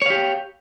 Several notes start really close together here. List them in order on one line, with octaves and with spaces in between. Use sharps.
C#5 F5 G4